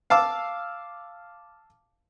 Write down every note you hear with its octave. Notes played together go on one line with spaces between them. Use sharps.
F5 A5 D6 E6